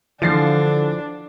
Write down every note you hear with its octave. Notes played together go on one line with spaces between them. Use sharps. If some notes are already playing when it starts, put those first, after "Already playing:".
D3 E3 F3 D4 A6 C7